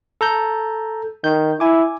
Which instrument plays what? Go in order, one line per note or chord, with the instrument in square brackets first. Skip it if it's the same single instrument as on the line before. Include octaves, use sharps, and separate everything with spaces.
[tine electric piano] A4 A#5 G6
[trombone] D#3 [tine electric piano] G6
[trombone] E4 [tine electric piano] G#5 D6